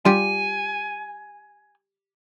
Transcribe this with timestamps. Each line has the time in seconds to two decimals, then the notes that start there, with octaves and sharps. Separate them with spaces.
0.05 G3 F4 G4 G#5